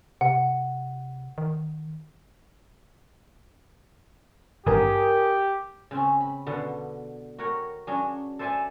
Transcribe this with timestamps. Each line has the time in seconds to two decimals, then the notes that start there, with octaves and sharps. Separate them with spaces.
0.21 C3 F#5
1.38 D#3
4.66 G#1 G2 D3 G4 A#4 G#5 D#6
5.91 C#3 C4 C#4
6.21 B5
6.46 B2 D3 B3
7.38 F#4 A#4 C#5 F#5 G5
7.87 F#3 C#4 D4 G#4
8.39 A4 C5 D5 E5 G#5 A5